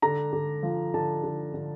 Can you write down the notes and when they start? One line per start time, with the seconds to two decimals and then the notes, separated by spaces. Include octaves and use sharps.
0.02 D3 A#5
0.33 D3
0.63 F3
0.94 D3 A5
1.23 D3
1.54 D3